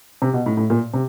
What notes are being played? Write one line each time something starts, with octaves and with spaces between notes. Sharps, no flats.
C3
B2
A2
A2
A#2
C3